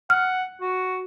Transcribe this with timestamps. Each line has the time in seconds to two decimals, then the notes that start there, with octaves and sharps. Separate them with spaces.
0.10 F#5 F6
0.61 F#4